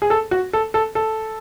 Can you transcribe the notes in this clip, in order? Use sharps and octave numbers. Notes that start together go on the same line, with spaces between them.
G#4
A4
F#4
A4
A4
A4